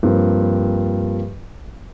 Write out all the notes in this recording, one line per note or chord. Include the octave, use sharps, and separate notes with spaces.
G2 F3 A#3 C4